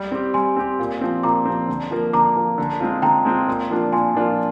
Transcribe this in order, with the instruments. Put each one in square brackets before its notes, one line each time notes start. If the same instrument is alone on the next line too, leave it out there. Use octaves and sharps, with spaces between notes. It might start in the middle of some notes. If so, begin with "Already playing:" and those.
Already playing: [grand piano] G3
C4 G4
[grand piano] G3 [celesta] G#5 C6
[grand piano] C4 G4
A#2
F3 C4
[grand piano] A#2 [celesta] A#5 D6
[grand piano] F3 C4
D3
F3 A#3
[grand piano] D3 [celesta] A#5 D6
[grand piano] F3 A#3
D3
G#3 C4 F4
[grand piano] D3 [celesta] G5 A#5
[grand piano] G#3 C4 F4
A#2
F3 A#3 D4 F4
[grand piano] A#2 [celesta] G#5 C6
[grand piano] F3 A#3 D4 F4